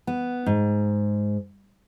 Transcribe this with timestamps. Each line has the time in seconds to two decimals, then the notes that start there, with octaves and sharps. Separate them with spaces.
0.07 B3
0.46 G#2